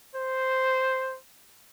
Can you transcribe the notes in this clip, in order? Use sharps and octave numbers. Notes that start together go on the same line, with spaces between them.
C5